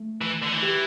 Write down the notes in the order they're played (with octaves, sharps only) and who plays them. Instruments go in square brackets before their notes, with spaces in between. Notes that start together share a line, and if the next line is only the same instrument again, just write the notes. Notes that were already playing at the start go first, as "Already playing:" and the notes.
Already playing: [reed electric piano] A3
[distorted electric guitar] E3
D3
E3
[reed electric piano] G4